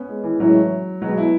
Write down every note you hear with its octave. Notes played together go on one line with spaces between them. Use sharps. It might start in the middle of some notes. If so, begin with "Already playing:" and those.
Already playing: B3 C#4
G#3
E3
A2 E3 F#3 G#3 C#4 E4
B2 F#3 G#3 B3 F#4
E4